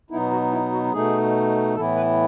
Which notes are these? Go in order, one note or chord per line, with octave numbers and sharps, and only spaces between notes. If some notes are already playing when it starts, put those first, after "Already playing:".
B2 F#3 B3 D#4 E4
F#4
E4
F#4
B2 A3 D#4 G#4
A2 E3 B3 E4 A4
B4